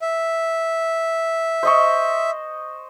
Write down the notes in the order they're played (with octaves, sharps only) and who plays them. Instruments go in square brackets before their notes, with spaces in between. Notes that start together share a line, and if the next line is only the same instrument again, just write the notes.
[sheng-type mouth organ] E5
[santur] C5 D#5 C#6